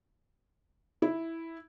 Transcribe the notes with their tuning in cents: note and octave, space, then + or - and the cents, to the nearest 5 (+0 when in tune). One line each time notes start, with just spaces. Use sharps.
E4 -5